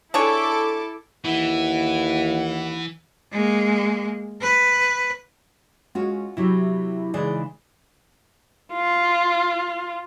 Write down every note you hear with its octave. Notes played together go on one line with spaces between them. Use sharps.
D4 E4 G#4 A4 C#5 D6
D#2 E3 E4 F#5
G#3 A#3
B4
G#3 C#4 F4 F#4
C3 F#3 E4 G4
C#3 E3 G#3 D#4 G#4 D5
F4